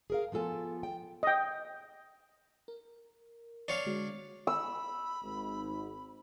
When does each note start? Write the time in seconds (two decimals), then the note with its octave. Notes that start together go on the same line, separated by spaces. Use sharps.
0.10 G#4 A#4 F5
0.32 F3 B3 F4 A4 G#5
0.83 G5
1.23 D#5 G5
2.68 A#4
3.68 D4 C#5 F5
3.86 D3 G#3 F#4
4.47 B5 E6
5.23 G#1 G#2